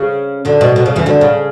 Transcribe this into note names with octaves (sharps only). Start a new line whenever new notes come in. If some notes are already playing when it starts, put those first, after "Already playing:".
Already playing: C#3
D2 D3
B2
B2
C#3
E2 E3
D2 D3
C#3